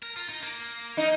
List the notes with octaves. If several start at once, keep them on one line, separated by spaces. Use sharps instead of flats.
A#4
F4
D#4
A#3
D#4